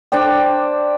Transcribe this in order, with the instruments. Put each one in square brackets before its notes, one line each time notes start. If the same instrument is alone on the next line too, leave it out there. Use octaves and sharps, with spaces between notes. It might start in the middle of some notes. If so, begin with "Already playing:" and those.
[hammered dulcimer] D4 C5 D5 G5